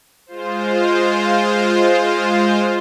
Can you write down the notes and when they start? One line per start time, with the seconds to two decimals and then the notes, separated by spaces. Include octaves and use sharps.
0.26 G#3 F4 C5